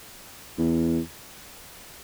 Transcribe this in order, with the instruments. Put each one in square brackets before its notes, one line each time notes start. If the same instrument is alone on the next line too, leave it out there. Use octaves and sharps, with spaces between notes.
[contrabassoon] E2